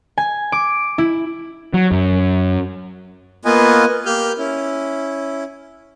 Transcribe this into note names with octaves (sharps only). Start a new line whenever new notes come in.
G#5
D6
E4
F#3
F#2
A#3 B3 F4 B4 D#5 G#5
A#3 G4 F6 G6
C#4 E4